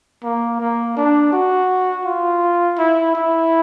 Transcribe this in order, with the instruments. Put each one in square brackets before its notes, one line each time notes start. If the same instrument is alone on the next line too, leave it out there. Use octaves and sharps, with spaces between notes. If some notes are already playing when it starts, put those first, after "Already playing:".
[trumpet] A#3
A#3
D4
F#4
F4
E4
E4